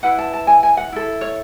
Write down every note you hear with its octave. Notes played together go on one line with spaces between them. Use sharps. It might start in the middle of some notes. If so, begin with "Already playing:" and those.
E4 B4 F#5
A5
A5
G#5
G#5
F#5
E4 A4
C#5